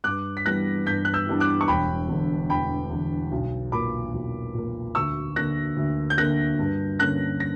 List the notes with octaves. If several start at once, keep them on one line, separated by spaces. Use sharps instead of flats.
G2 D6 F#6
B6
E3 G3 B3 D4 F#6 A#6
G2 G6 B6
F#6
E6 G6
E3 G3 B3 D4
D6 F#6
C#6
E1 G5 B5
E2 D3
E1 G5 B5
E2 D3
B1
A#2 A#3 B5 D6
B1
A#2 A#3
D2 C#6 E6
D3 A#3 F#6 A#6
D2
G6
D3 A#3 F#6 A#6
G2
D3 A#3 C#4 F#6 A#6
A#6